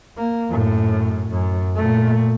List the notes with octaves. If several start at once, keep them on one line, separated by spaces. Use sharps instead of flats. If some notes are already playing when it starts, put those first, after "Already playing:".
A#3
F#2 A2
F#2
A#2 A3